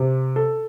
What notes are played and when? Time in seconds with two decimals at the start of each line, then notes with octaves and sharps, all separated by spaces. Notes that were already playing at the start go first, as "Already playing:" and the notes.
Already playing: C3
0.36 A4